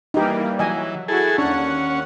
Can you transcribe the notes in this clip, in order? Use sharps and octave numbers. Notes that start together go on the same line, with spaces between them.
E3 G3 A#3 D#4 G4
E3 F#3 D#5 G#5
E4 F#4 G#4 A4
D#2 C#4 D4 F#5